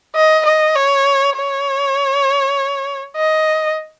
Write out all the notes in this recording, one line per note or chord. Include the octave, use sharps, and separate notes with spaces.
D#5
D#5
C#5
C#5
D#5